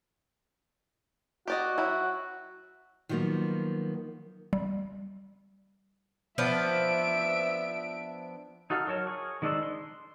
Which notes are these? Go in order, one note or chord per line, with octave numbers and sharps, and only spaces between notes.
F#4 G4 D5 D#5
F#3 E4
D#3 F3 F#3 A#3 B3
G3
F3 B3 D4 E5 D7
D#4 F#4 A4 F5
F#3 A#4 C#5 A5
G#4 C#6
D#3 G#3 D4 A4 C5
C6